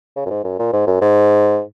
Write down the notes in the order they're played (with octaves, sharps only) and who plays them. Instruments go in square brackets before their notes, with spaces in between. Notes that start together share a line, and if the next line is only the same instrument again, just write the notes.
[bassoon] C#3
F#2
G#2
F#2
A#2
G#2
F#2
G#2